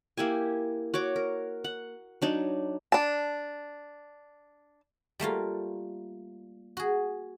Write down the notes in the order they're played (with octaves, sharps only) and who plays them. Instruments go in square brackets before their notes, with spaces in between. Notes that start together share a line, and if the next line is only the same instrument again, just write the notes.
[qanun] A#3 E4 G4 G#5
F#4 C#5 D6
A#4
F#5
F#3 D4 D#4
[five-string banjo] D4 A5
[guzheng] G3 A3 A#3 F4
F#4 G#4